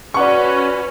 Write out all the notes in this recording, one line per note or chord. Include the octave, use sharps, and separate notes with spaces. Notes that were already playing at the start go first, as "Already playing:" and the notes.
C#4 F#4 B4 D5 F#5 C#6